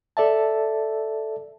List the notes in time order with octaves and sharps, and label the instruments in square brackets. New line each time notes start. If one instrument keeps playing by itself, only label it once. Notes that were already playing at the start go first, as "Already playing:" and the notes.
[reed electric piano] A4 D5 E5 A5